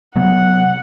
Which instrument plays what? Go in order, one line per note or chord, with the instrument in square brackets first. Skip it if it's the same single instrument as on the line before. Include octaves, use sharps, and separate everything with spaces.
[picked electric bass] C3 F#3 B3 [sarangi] F#5